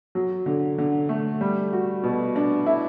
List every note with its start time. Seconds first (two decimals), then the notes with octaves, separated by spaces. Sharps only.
0.15 F#3
0.46 D3
0.78 D3
1.09 A3
1.41 G3
1.73 F#4
2.03 B2
2.36 D4
2.66 E4